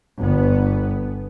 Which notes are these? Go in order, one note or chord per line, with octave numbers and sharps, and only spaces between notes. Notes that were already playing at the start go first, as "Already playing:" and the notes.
G1 B3